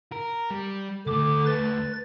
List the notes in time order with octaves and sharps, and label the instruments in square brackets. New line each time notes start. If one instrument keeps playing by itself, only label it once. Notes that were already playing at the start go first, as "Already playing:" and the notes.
[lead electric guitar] A#4
G3
[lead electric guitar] D2 A3 [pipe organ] D3 D6
[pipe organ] B4 A6